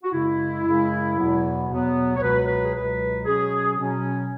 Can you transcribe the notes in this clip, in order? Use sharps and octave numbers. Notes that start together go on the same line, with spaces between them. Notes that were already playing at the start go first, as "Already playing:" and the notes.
F#4
F#2 C#3 G#3 E4
F#2 C#3 G#3
E2 B2 F#3 B3
E2 B2 F#3 B3
C#5
C#2 B2 F#3 B4
B4
G#4
C#2 B2 F#3 B4
B2 F#3 C#4 G#4
B2 F#3 C#4